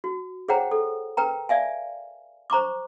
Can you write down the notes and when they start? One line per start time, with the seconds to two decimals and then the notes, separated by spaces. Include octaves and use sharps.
0.04 F#4
0.48 G#4 C5 C#5 F#5 G5 A#5
0.71 A4
1.17 A#4 B4 G5 A#5
1.49 D5 E5 F5 G#5
2.50 C5 A#5 C#6 D6